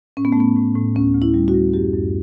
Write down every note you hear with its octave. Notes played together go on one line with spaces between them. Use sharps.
A2 C#4
B3
A3
A2 B3
A2
A2
D2 C#4
D2
E4
G3
F#4
G3
F#2 G4
F#2